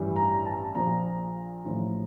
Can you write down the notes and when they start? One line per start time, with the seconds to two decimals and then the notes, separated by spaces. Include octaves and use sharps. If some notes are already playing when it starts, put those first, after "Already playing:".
Already playing: A1 G2 E3 G3
0.16 A#5
0.46 A5
0.75 A#1 A#2 F3 A#5
1.64 A1 A2 F3